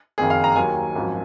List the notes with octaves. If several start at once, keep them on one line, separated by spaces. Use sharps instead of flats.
F#1 F2 D#3 A#3 G#4
F5
A#5
D#2 D#3 F#3 A#3 G#5
G#1 F#2 F3